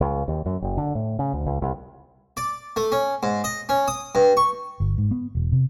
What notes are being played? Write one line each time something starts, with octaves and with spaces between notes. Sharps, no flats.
C#2
D#2
F#2
F#1
D3
A2
C#3
D2
C#2
C2
D5
A3
C#4
G#2
D#5
C#4
D#6
G2
C#6
G1
G#2
B3
E1
C3